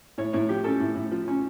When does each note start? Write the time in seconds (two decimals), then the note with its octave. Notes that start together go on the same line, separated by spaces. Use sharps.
0.18 A2 C#5
0.33 A2 C#5
0.49 F3 G4
0.64 C#4 A4
0.80 A2
0.95 A2
1.11 F3
1.28 C#4